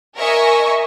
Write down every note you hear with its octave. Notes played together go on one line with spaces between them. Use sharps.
A#4 D#5 E5 G#5 C#6